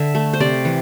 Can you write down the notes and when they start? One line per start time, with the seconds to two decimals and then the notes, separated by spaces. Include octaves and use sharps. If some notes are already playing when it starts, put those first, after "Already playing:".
Already playing: D3 E5
0.15 A3
0.33 C5
0.40 C3 D5
0.65 E3